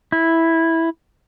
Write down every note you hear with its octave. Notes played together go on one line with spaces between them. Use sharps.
E4